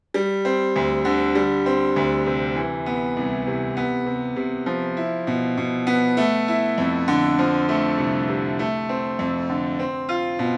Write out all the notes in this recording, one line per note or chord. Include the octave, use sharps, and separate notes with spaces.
G3
C4
D2
D3
G3
C4
D2
C3
E3
B3
C2
C3
B3
C3
C3
F3
E4
B2
B2
B3
A3
E4
F2
D3
F3
A3
C2
C3
A3
C4
F2
D3
C4
F4
B2